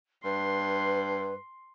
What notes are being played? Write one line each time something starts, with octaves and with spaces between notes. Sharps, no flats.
G2 B4 C6